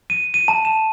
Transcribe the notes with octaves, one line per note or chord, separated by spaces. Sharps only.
D#7
D#7
A5
E7